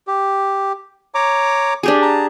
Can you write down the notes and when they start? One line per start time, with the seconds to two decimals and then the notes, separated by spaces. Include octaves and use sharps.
0.07 G4
1.15 C#5 A#5 D6
1.83 D4 G4 G#4
2.02 A5 A#5